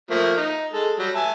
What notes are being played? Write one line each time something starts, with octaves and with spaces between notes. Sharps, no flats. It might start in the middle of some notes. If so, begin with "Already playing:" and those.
F3 A3 A#3
D#4
G#3 A4
F#3 G3
E5 G#5 A5